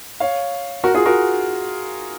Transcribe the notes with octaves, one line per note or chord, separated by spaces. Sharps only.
C#5 F5
F#4 A#4
F4 G#4
F#4 A#4